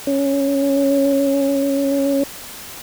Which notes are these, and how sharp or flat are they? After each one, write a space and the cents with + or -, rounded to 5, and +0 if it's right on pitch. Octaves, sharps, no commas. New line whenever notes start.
C#4 +0